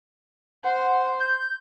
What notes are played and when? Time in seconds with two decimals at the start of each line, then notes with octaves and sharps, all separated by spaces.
0.64 C5 F#5
1.20 G6